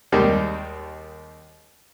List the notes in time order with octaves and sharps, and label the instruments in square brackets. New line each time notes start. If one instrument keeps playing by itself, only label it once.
[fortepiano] D#2 D#3 G3 G#3